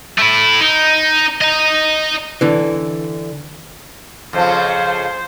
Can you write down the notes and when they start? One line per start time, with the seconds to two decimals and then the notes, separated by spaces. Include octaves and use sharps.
0.18 A3 E4
0.61 D#4
1.42 D#5 A#5
2.41 D3 E3
4.33 F2 C#3 F3 C5